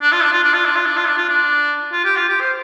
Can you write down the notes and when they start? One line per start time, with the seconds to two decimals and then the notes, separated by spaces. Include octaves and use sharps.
0.02 D4
0.13 F4
0.23 D4
0.33 F4
0.44 D4
0.54 F4
0.65 D4
0.76 F4
0.86 D4
0.97 F4
1.08 D4
1.18 F4
1.29 D4
1.92 F4
2.05 G4
2.16 F4
2.29 G4
2.40 C5